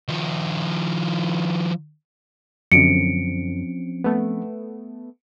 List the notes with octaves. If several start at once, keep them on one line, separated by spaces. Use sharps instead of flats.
D#3 F3
F#2 D3 F3 C4 C#4 C#7 D7
A3 B3